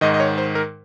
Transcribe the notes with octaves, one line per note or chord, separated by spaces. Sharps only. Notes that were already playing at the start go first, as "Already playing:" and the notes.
G#2 D#3 D#5
D#5
C#5
C5
A#4